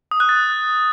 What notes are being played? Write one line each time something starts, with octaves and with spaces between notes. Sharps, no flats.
D#6
F#6
A6